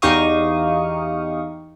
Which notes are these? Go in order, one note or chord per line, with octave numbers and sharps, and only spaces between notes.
E2 D#4 G4 F5 C#6 D#6